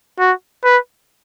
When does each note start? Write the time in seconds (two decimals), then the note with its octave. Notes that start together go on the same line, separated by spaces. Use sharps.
0.19 F#4
0.64 B4